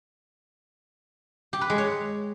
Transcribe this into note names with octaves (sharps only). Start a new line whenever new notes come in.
G4
B4
G#3
C#5